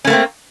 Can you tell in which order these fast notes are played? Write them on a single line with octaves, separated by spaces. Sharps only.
C#4 A3 A#3 C4